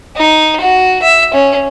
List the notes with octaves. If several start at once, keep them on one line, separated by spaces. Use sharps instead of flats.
D#4
F#4
E5
C#4